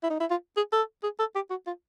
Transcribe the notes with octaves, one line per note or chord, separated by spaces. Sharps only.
E4
D#4
E4
F4
G#4
A4
G#4
A4
G4
F#4
F4